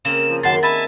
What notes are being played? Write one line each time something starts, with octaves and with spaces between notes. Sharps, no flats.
C#3 A#3 C4 E7
F3
F#2 D#3 F#5 A5 C6 A6
E5 G#5 A5 B5 A6